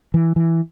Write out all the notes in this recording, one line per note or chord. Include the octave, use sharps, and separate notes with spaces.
E3
E3